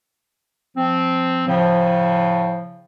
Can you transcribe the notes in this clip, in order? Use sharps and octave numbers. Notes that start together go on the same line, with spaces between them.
F3 C4
A2 C#3 F3